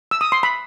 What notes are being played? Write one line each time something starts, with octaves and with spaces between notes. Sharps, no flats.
E6
D#6
C6
B5